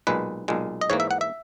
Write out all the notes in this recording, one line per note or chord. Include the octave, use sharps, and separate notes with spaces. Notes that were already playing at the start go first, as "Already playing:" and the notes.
B1 A#2 G#3 B4
B1 A#2 G#3
D#5
G#2 E3 A#3 C#5
E5
F#5
E5